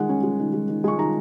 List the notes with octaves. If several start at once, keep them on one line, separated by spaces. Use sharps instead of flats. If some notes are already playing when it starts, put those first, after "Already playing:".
Already playing: D#3 G#3 F#5
C#4
G#3
D#3
G#3
D#3
G#3 C#6
D#3 A#5